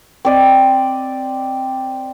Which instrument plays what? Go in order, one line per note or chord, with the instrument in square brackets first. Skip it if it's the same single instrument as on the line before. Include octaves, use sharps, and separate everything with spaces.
[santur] C4 D5 D#5